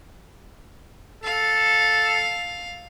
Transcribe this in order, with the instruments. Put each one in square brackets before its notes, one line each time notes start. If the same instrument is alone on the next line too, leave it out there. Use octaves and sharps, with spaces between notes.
[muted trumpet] A4 [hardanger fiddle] F5